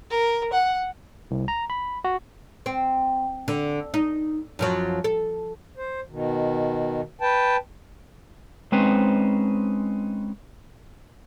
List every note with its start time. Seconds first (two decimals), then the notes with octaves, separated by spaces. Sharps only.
0.11 A#4
0.53 F#5
1.31 C2
1.48 A#5
1.70 B5
2.04 F#4
2.66 C4
3.48 D3
3.94 D#4
4.59 F#2 F3 F#3
5.04 A4
5.77 C5
6.10 B2 D#3
7.21 B4 G5 A5
8.72 G#3 C4 C#4 D#4 B4 C5